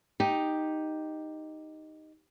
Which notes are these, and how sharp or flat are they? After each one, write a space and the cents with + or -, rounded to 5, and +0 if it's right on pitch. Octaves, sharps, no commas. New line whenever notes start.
D#4 +0 G4 +0